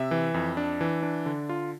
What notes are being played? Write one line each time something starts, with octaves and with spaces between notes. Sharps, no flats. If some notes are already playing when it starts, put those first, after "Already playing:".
Already playing: C3 E5
E3
F2
D4
E3
D4
D3
F4